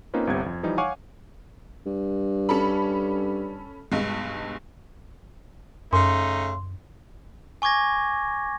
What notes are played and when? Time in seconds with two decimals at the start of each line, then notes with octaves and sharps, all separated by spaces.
0.14 A#3 C4 C#4 D#4 F4 B4
0.27 G1 C2 C3 B3 G#6
0.46 F2
0.63 E3 F3 G3 D#4
0.78 C#5 F5 F#5 G#5 C#6 D6
1.86 G2
2.49 C#4 A4 B5
3.92 B1 G2 G#3
5.93 F#2 C#3 A3 D#4 C6
7.62 G#5 C#6 D6 G#6 A#6